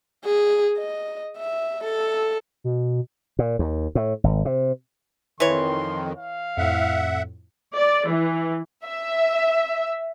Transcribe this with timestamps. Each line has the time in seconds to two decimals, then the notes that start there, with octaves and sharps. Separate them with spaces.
0.24 G#4
0.78 D#5
1.37 E5
1.84 A4
2.64 B2
3.39 A#2
3.59 D#2
3.95 A2
4.24 G#1
4.45 C3
5.40 F2 D#3 E3 C#5 C6
6.17 F5
6.57 F2 A2 E5 F#5
7.75 D5
8.08 E3
8.86 E5